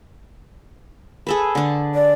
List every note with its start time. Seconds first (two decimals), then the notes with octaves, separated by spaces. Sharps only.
1.27 G#4 A4 B4
1.55 D3 D4
1.95 D5